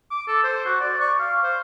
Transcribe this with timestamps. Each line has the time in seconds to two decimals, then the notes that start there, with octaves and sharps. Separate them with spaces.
0.11 D6
0.28 A4
0.44 C5
0.65 F#4
0.81 D5
1.01 C#6
1.19 F5
1.44 C5